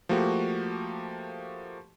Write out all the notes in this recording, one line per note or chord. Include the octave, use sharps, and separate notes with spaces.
F3 A3 A#3 F#4 G4